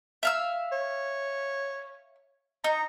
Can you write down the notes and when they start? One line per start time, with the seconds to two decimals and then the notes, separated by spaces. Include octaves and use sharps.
0.23 E5 F5 E6
0.72 C#5
2.64 D#4 A#5